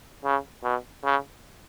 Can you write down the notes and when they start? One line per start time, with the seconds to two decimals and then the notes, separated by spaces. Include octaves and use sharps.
0.25 C#3
0.64 B2
1.04 C#3